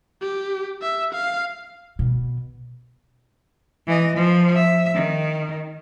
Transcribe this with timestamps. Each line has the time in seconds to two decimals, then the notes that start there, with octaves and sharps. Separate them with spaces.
0.22 G4
0.82 E5
1.14 F5
1.99 B2
3.87 E3 D#5
4.16 F3
4.56 E5
4.94 D#3